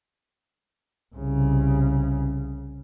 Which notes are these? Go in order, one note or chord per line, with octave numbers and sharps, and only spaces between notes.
C2 C#3